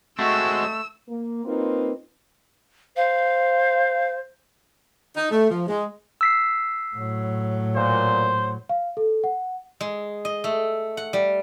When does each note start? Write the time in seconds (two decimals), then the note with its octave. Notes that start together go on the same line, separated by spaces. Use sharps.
0.19 G#3 A3 C4 F#4 E6
1.09 A#3
1.45 A#3 C4 D#4 F4 B4
2.96 C5 F5
5.16 D#4
5.31 A3
5.50 F3
5.68 G#3
6.21 E6 B6 C7
6.95 A2 F#3
7.75 A#2 C5
8.69 F5
8.97 A4
9.24 F#5
9.81 G#3
10.25 D#5
10.44 A3
10.97 F#5
11.13 G3